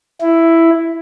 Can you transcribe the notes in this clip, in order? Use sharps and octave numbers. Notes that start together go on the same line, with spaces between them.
E4